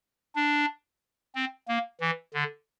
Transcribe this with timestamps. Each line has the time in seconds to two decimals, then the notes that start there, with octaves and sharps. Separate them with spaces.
0.36 D4
1.35 C4
1.68 A#3
2.01 E3
2.34 D3